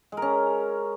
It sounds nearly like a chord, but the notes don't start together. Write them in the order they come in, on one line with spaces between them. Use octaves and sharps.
G#3 A#4 C#4